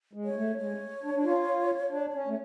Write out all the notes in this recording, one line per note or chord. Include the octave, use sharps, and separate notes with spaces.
G#3
C#5
A3
G#3 C#5
D4
D4
F4
D4
C#4
A3